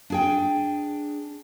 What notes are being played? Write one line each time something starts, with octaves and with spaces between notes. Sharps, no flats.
D4 G#4 G5